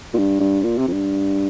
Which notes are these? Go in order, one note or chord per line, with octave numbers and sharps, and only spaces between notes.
A#2
G2
G2
A#2
C3
F2
G2